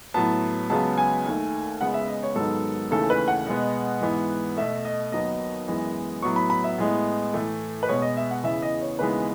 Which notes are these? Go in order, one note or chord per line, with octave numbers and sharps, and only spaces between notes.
A2 F#3 B3 A5
C#2 C#3 F#3 B3 A5
G#5
D#2 D#3 A3
C#2 C#3 G#3 B3 F#5
E5
D#5
C#5
G#2 D#3 F#3 B3 A4
D#2 C#3 E3 A3 A4
B4
F#5
B2 G#3 B3
G#2 E3 B3
B2 A3 E5
D#5
D#2 D#3 F#3 B3 D#5
F#2 E3 G#3 B3
A2 F#3 B3 C#6
B5
B5
E5
A2 G#3 B3
A2 E3 A3
B4
B2 G#3 B3 C#5
D#5
E5
F#5
E2 C#3 E3 B3 E5
D#5
C#5
D#2 C#3 E3 G#3 B3 B4